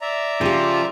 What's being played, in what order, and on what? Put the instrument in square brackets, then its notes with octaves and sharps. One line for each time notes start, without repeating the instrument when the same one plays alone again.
[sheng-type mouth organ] D5 E5 A#5
[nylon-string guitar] C#3 G4 [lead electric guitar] F3